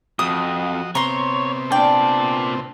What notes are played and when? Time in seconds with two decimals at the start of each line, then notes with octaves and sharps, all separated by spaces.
0.19 F2 F#4 D#5 D#6
0.95 C3 B3 C4 C#5 A#5 C6
1.72 A#2 D4 D5 G5